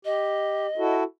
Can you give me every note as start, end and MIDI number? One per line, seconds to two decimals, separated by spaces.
0.05 0.67 67
0.05 0.95 75
0.78 1.03 64
0.78 1.03 66
0.78 1.03 69